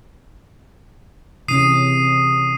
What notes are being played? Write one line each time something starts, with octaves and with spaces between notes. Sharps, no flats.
C3 E3 C#4 D#6 C7 D#7